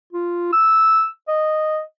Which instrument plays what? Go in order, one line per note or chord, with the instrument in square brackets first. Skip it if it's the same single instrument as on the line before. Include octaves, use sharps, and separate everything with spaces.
[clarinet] F4
E6
D#5